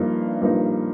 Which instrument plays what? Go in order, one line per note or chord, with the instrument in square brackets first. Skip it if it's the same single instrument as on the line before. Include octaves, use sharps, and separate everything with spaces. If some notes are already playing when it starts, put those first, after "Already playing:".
Already playing: [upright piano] G2 F3 A#3 D#4
G2 F3 A#3 D#4